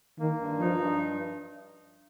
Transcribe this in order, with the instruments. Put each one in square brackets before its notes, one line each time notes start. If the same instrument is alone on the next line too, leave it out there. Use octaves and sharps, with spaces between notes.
[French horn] D#3 [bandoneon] A#3
[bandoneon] G2
[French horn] F3 [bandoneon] D#4
[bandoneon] G2